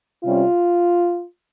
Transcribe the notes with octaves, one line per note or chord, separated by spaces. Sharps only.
C3 G3 C#4 F4